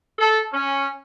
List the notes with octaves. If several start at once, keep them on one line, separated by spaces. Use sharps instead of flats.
A4
C#4